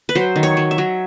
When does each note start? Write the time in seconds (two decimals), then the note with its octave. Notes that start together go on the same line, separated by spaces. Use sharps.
0.09 B4
0.15 F#3 C5
0.36 D#3
0.43 C#5
0.57 F#3
0.71 E5
0.78 F#3